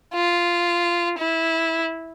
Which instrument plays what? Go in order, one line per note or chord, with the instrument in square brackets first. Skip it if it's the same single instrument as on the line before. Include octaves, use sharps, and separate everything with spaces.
[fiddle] F4
E4